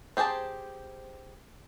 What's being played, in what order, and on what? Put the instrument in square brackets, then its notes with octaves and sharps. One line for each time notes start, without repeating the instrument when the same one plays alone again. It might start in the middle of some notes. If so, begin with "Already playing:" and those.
[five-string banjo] C4 G4 G#4 C5 A5